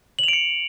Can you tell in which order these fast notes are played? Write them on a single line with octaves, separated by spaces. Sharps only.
F#7 F7 D7 C#7